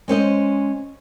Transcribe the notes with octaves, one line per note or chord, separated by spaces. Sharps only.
G#3 C#4 C5 D#5